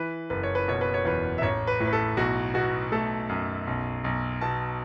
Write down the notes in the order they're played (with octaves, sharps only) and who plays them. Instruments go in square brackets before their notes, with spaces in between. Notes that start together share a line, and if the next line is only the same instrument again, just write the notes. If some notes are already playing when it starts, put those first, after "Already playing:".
Already playing: [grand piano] E3 B4
F#1 B4
C#5
B4
B2 C#5
B4
C#5
E2 B4
E5
A1 C#5
B4
A2
B4
A4
B1 F#4
B2 F#4
A3 A4
F#2
B1
B1
B2 A5